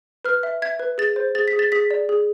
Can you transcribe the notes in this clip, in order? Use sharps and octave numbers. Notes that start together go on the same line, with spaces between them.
B4 F6
E5
E5 G#6
B4
G#4 A6
C5
G#4 A6
B6
G#4
A6
G#4 B6
D5
G#4